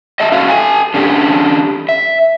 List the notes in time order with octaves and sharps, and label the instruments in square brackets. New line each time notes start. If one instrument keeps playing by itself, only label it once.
[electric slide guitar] D#5 E5 A5
A3 C#4 F#4 E5 F5
A4 G#5 A5
D3 C#4 D4 G4
E5